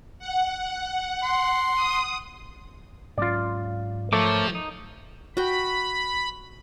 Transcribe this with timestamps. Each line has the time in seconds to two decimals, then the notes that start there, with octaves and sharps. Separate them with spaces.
0.19 F#5
1.23 C6
1.75 D#6
3.18 G#2 F#3 C#4 F4 D5
4.13 F3 A3 A#4 C#5 D6
4.55 D#4
5.37 F#4 G5 B5